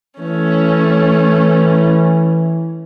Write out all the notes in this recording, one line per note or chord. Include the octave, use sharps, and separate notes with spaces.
E3 A3 C#4